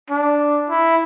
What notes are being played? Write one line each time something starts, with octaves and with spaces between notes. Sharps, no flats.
D4
E4